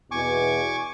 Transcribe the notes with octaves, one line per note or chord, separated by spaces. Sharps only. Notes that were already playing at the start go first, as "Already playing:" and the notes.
E2 B2 G#5 C#6 D6